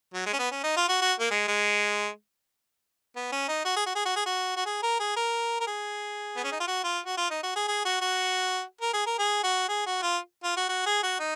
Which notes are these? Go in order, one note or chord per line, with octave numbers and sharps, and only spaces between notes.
F#3
G#3
C#4
B3
C#4
D#4
F4
F#4
F#4
A#3
G#3
G#3
B3
C#4
D#4
F#4
G#4
F#4
G#4
F#4
G#4
F#4
F#4
G#4
A#4
G#4
A#4
A#4
G#4
B3
C#4
D#4
F4
F#4
F4
F#4
F4
D#4
F#4
G#4
G#4
F#4
F#4
A#4
G#4
A#4
G#4
F#4
G#4
F#4
F4
F4
F#4
F#4
G#4
F#4
D#4